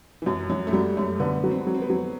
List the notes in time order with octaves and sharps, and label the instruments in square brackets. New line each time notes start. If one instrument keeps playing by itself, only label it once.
[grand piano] E3
[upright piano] F#2 [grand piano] F#3
[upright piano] F#2 [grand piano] F#3
[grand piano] A3
[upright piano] F#3 [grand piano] G3
[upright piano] F#2 [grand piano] A3
[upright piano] D3 [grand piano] B3
[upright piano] F#3
[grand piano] C4
[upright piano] F#3
[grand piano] C4
B3
[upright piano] F#3